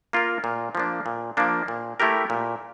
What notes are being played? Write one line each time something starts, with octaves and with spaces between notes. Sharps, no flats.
A#3 F4 A#4
A#2
F3 A#3 D4
A#2
F3 A#3 D4
A#2
A3 E4 G4 A#4
A#2